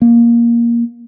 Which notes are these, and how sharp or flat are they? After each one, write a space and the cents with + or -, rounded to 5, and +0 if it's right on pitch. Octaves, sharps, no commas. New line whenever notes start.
A#3 +10